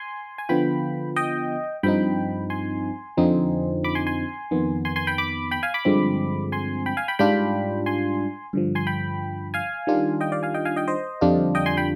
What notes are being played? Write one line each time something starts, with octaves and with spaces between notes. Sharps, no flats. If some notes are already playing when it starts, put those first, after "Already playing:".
Already playing: G#5 C6
G#5
D3 F3 B3 F4 G5 B5
D#5 G5
G2 F3 C4 D#4 G5 B5
G#5 C6
F2 D3 F3 C4 D#4
B5 D6
G#5 C6
G#5 C6
F2 D#3 B3
G#5 C6
G#5 C6
G5 B5
B5 D6
G5 B5
F5 G#5
B5 D6
G2 D3 F3 G#3 C4
G#5 C6
G5 B5
F5 G#5
G5 B5
G#2 G3 D4 F4 G5 B5
G#5 C6
G2 D3 F3
G#5 C6
G5 B5
F5 G#5
D#3 G3 D4 F4
D#5 G5
D5 F5
F5 G#5
D#5 G5
F5 G#5
D#5 G5
C5 D#5
F2 D3 G3 D4 F4
D#5 G5
G#5 C6
G5 B5